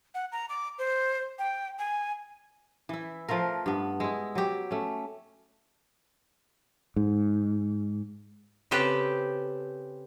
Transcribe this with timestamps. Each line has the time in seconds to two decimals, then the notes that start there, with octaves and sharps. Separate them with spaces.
0.15 F#5
0.32 A#5
0.49 D6
0.79 C5
1.39 G5
1.79 G#5
2.89 E3 E4
3.28 F3 A3 F4 A#4
3.66 G2 B3
4.00 G#3 E4
4.35 F#3 G4
4.71 A3 C#4
6.96 G#2
8.71 C#3 C4 G4 A4 B4